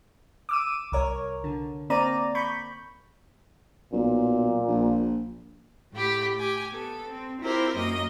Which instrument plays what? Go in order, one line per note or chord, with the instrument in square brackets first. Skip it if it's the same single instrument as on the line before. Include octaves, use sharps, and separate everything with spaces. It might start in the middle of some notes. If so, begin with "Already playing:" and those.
[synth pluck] D6 E6 D#7
C2 A#4 C#5
D3
A#3 C4 D5 A#5 D#7
B5 C#6 G6
[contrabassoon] B1 [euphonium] A#2
[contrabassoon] A#1
[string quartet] A2 A3 G4 B5
G4 G#5
B3 A4
C4
C4 E4 F4 G4 A#4 C5
F#2 A#3 D#5